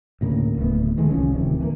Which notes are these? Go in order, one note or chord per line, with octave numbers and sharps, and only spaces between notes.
D2 A2 C#3 A#3
D1 A3 B3
D#3 E3 G#3 A3
C2 F3 C#4
D1 C#2 C3 D#3
E3 A3 A#3